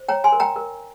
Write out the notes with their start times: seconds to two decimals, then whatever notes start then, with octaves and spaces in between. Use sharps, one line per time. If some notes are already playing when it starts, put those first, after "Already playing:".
Already playing: C5
0.08 C#5 G5 A#5
0.24 G#5 C6
0.32 A#4
0.40 G5 A#5
0.56 A#4